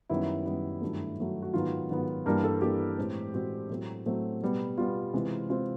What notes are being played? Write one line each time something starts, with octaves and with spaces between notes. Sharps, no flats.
F#2 D#3 G3 B3 E4
F#2 D#3 G3 B3
G2 D#3 F#3 A3
G2 D#3 F#3 A3
F#4
G#2 D#3 F#3 B3 F4
G#2 D#3 F#3 B3
G2 E3 G3 A#3 A#4
A4
G2 E3 G3 A#3 G4
A2 E3 G#3 C4
A2 E3 G#3 C4 F#4
A2 F#3 A3 C4
A2 F#3 A3 C4
B2 G3 B3
B2 G3 B3 F4
C3 E3 G#3 C4
C3 E3 G#3 C4 F4